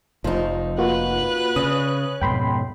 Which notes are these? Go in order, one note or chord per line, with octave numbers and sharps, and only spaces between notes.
F1 F3 D#4
A#3 F4 F#4 B4 F#6
C#3 C#4 D#6
F2 G#2 B2 G5 B5 C6